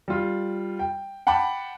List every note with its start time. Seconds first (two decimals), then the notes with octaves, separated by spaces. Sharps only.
0.08 G3 F4
0.79 G5
1.27 F#5 G5 A5 B5 D6